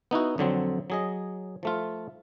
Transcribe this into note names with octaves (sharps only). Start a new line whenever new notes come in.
B3 D#4 E4 F#4
F2 D3 F#3 C4
F#3 G#4 D#5
F3 A3 F4